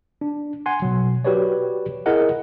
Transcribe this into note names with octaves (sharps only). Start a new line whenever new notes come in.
D4
F#5 G#5 C6
B2 F#3
F#4 G4 B4 C#5 D5
E4 G#4 A#4 D#5 F#5